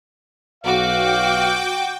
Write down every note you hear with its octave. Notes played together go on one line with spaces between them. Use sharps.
B1 F#4 F5 G5 D6